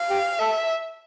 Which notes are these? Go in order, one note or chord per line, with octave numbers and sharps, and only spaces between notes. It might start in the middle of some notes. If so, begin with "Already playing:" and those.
Already playing: F5
G4
A4 E5